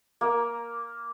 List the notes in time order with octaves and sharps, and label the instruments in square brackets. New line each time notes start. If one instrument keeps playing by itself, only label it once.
[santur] A#3